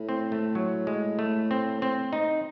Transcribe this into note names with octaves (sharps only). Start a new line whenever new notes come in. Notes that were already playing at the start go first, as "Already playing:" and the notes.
Already playing: A2
C4
A3
F#3
G#3
A3
C4
C4
D#4